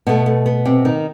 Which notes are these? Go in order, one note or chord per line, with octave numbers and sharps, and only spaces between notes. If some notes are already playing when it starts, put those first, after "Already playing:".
B2 A3 B3
A3
B3
C3 C4
D#3 D#4